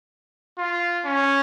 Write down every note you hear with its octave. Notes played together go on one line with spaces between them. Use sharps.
F4
C#4